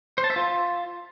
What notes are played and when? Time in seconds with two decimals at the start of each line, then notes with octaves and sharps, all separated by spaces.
0.18 C5
0.24 A5
0.30 E5
0.36 F4